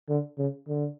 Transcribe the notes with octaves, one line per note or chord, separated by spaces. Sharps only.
D3
C#3
D3